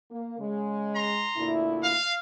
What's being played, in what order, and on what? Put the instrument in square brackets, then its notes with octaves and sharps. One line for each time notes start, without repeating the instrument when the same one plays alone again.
[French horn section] A#3
C#3 G#3
[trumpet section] A#5 C6
[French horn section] D2 A#2 E4
[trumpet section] F5